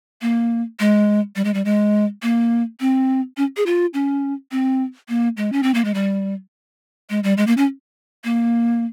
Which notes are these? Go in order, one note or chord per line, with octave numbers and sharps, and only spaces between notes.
A#3
G#3
G3
G#3
G3
G#3
A#3
C4
C#4
G#4
F4
C#4
C4
A#3
G#3
C#4
C4
A#3
G#3
G3
G#3
G3
G#3
A#3
C#4
A#3